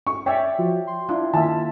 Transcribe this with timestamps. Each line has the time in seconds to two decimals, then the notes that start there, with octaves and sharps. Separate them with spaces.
0.07 C#6
0.26 C#5 D5 E5 G5
0.59 F3 F4 F#4
0.87 C6
1.09 D4 E4 F4
1.33 D#3 A#3 E4 F4 E5 A5